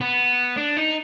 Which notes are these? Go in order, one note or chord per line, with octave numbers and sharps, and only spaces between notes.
B3
D4
D#4